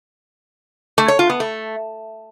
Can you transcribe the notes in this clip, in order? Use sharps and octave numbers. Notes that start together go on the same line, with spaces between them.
A3
C#5
F4
B3
A3